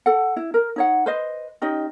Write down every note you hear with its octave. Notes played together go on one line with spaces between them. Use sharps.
A4 F#5
E4
A#4
D#4 C#5 F#5
B4 C5 D#5
C#4 D#4 G4 D#5